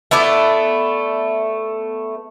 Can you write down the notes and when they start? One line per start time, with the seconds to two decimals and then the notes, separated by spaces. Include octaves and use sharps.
0.11 A3 B3 E4 D5